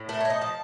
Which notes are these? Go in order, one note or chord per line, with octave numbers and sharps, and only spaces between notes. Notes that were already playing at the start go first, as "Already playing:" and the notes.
Already playing: A2
A3 A#4
C#5
D#4
D#5
F3 A5